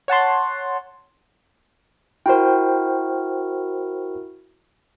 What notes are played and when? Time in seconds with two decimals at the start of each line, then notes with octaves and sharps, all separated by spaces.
0.08 C#5 F#5 A5 C6
2.26 E4 F#4 A#4 C5 G5